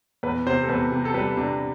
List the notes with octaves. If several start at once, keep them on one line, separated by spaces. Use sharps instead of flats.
E2 B4
C3 C5
A4
E2 B4
C3
A4
G3 B4
C3 D4